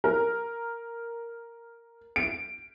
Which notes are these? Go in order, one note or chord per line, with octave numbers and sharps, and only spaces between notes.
A#4
D7